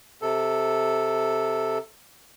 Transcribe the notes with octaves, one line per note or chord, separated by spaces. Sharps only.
C3 A4